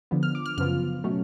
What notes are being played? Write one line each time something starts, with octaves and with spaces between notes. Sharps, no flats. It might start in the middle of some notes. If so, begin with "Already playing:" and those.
D3 F3 B3
F6
D6
F6
F#2 C#3 F3 B3 F4 F6
B2 F#3 A3 C#4